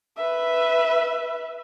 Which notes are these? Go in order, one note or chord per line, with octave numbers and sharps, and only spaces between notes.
B4 E5